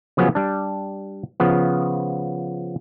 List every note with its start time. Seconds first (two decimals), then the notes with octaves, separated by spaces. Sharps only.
0.17 C#3 F3 F#3 B3 C#4
0.35 G3 D4
1.40 C#3 F3 B3